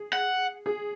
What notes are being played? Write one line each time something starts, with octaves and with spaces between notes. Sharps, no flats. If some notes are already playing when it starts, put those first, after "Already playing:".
Already playing: G#4
F#5
G#4